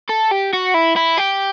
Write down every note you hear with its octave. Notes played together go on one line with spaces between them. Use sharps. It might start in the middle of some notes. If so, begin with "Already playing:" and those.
A4
G4
F#4
E4
E4
G4